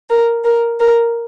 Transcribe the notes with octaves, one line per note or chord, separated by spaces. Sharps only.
A#4
A#4
A#4